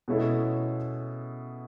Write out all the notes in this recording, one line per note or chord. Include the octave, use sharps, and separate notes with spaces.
B2 G#3 C#4 E4 A4